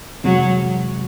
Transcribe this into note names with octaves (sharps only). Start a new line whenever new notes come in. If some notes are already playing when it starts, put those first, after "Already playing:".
F2 C3 E3 F#3 G#3 C4